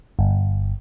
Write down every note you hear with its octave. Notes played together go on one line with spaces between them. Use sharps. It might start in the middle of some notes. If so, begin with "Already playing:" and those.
G1